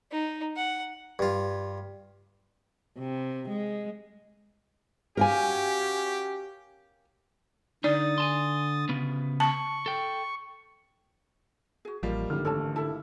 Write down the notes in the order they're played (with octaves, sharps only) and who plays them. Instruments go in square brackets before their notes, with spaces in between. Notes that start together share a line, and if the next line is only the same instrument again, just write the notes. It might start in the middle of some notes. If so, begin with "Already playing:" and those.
[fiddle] D#4
F#5
[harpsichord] G2 F4
[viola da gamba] C3
G#3
[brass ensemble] C#4 F#4 G4 [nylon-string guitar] A#4 F5 G#5
[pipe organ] D3 D#6 A6 [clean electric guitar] D#4 [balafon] D5
[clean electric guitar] G#5 A5 C6
C#3 B3
[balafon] A5 [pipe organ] C#6
[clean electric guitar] A4 G5
[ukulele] F#4 G#4
[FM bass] A1 [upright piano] F3 G3 A#3 [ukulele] D#5
[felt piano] G#1 G4 F6 [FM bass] D3
[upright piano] A1 [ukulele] A4 C#5 A5
[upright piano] E4 [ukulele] A4 A5